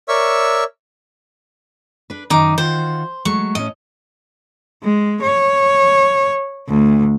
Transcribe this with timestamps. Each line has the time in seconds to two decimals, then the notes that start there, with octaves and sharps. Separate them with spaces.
0.08 A#4 C#5 D5 E5 C#6 E6
2.10 D4 B4
2.30 F#2 D#3 D#4 D6
2.58 D#3 F4 F#4 C5
3.25 F#3 G#3 A3 C#6
3.55 A2 C#4 D#5
4.83 G#3
5.22 C#5
6.68 D2